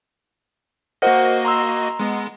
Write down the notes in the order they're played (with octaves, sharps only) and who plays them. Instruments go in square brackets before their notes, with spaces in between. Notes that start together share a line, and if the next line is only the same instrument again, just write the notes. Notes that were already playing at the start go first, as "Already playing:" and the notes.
[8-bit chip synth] A#3 F#4 D#5 [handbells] A#4 C5 F#5
[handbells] A#5 C6 E6
[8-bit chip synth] G#3 B3